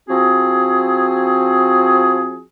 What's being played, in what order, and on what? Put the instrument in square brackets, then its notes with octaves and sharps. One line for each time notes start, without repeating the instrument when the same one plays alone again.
[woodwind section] F3 C4 F#4 G#4